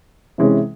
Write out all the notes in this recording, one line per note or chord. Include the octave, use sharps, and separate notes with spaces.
C3 E3 G#3 C#4